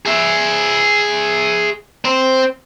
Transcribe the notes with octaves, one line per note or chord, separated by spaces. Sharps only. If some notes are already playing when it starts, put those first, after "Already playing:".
G#4 E5
C4 C5